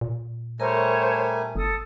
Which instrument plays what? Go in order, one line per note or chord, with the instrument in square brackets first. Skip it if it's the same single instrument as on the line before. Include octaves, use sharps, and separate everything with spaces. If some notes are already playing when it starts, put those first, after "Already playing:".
[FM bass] A#2
[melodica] G3 A3 G#5 [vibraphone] A#4 A#5 [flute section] C5 C#5
[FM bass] G1 [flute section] A4 D#6